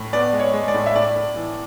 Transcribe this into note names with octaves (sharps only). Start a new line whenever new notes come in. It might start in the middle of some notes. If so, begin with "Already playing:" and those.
Already playing: A2
B3 D5
G#3
C#5
G#3
D5
A2
E5
A2 D5
A2
E3